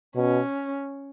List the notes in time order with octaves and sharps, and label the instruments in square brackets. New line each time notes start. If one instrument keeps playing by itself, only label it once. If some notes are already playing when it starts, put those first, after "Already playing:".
[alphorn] B2 [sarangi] C#4